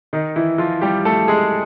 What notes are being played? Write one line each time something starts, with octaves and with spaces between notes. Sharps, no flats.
D#3 D#4
E3 E4
F3 F4
G3 G4
A3 A4
G#3 G#4